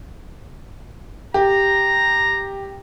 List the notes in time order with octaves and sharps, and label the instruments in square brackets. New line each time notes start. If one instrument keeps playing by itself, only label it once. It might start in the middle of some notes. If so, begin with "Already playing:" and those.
[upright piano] G4 [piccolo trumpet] A#5